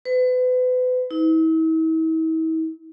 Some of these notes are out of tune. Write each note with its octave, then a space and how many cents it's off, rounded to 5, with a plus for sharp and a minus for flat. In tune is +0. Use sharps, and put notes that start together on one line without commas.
B4 +35
E4 -45